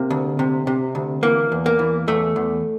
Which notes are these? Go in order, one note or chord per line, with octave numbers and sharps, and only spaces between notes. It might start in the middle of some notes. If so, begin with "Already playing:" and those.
Already playing: C3 A#3
D2
C3
C3
D2
E3 A#3
E2
A#3
E3
E2 A3
E2